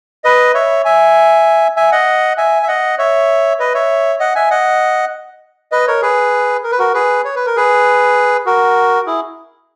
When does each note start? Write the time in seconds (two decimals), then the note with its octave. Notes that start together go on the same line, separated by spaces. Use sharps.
0.24 B4 D#5
0.54 C#5 E5
0.85 E5 G#5
1.76 E5 G#5
1.92 D#5 F#5
2.38 E5 G#5
2.63 E5
2.68 D#5 F#5
2.98 C#5 E5
3.59 B4 D#5
3.74 C#5 E5
4.19 D#5 F#5
4.36 E5 G#5
4.50 D#5 F#5
5.72 B4 D#5
5.87 A#4 C#5
6.02 G#4 B4
6.64 A#4
6.71 B4
6.79 F#4 A#4
6.94 G#4 B4
7.25 C#5
7.35 B4
7.46 A#4
7.56 G#4 B4
8.46 F#4 A#4
9.07 E4 G#4